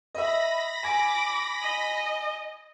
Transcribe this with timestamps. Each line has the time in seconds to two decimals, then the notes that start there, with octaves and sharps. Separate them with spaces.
0.15 D#5 E5 B5 A#6
0.84 G#5 D6
1.62 D#5